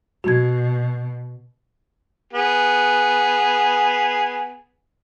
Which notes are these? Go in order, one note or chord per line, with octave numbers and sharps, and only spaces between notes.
B2 F#4 G#6
B3 G#4